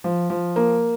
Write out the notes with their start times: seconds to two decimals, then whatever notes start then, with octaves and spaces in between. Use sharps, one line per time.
0.04 F3
0.30 F3
0.56 A#3